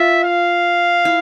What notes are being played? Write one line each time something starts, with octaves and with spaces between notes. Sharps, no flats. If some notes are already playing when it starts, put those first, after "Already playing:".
Already playing: F4 E5
F5
E4